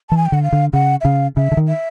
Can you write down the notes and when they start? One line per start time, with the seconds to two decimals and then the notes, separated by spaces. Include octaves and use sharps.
0.09 E3 A5
0.17 G#5
0.26 G5
0.32 D3 F#5
0.43 F5
0.53 D3
0.73 C#3 F#5
1.01 E5
1.05 C#3 F5
1.37 C#3 E5
1.52 D3
1.57 D#3
1.68 E5